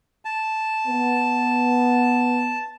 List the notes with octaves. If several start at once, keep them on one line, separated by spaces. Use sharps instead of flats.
A5
B3